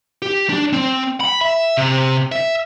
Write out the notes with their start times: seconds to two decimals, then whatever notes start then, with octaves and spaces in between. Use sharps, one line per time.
0.22 G4
0.49 D4
0.73 C4
1.20 B5
1.41 E5
1.77 C3
2.32 E5